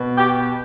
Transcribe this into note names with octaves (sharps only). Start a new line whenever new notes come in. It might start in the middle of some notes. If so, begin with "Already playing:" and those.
Already playing: B2
G4